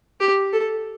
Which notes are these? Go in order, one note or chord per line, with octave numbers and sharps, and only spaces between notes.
G4
A4